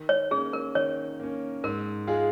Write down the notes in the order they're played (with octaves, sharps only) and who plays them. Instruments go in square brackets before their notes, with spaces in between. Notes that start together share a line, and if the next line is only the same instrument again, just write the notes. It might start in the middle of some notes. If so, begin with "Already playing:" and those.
Already playing: [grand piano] D#3
[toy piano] C#5
[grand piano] C#4 [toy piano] G#4
[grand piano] A#3
[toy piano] A#4
[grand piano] D#3 [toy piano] C#5
[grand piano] A#3 C#4
[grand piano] G#2 [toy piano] A#4
[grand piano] G#3 F4 G#4